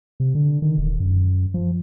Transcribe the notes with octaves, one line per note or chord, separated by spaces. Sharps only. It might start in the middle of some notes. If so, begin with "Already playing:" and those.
C3
D3
D#3
D#1
F#2
F3